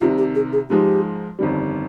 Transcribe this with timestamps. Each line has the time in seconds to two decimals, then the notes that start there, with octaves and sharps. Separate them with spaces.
0.01 C2 C3 D#3 F4
0.18 G4
0.35 G#4
0.53 G#4
0.69 G#2 F3 G#3 D#4 G4
1.39 G1 F2 D#3 G3